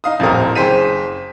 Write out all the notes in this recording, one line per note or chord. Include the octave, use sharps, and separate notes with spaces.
D#4 F5 D#6
D#1 A1 F2 E4 A#4 C5
F#1 G#4 C5 G5 B6 D#7